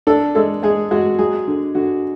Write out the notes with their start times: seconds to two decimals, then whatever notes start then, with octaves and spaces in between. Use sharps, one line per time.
0.07 D4 A4
0.35 G#3 A4
0.63 G#3 G#4
0.91 G#3 F#4
1.19 F#3 G#4
1.47 D3
1.75 D3 F#4